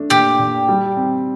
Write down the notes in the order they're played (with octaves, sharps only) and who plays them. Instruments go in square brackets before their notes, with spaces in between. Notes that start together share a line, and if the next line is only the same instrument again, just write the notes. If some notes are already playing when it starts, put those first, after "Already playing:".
Already playing: [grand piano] A3 D4
[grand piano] A#2 [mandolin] G4
[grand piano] A#2
G3
C4